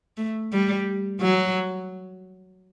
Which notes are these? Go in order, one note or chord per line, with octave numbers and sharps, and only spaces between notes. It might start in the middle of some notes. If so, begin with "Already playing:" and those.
A3
G3
F#3